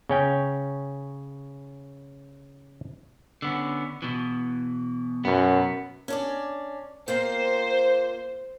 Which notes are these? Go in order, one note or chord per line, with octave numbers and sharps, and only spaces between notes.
C#3 C#4 G5
D3 B3 C#4
B2 E3
F#2 B2 B3
C#4 D4 D5
A#3 F4 C5 G5